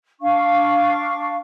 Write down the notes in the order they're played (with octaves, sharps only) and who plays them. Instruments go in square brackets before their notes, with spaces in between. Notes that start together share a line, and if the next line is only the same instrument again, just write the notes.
[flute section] D4 F5 C#6